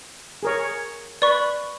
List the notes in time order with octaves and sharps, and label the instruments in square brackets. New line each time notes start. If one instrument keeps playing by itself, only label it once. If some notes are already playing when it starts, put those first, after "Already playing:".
[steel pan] G#4 A#4 C#5
[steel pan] B4 [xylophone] D5 C#6